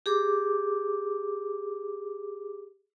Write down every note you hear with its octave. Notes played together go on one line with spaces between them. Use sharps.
G4 G#4 D6